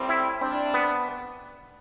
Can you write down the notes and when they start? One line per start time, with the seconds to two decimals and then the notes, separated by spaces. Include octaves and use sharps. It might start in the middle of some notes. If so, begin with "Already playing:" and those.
Already playing: A2 G3 C4
0.09 E4
0.41 C3 G3 C4 D4
0.74 B3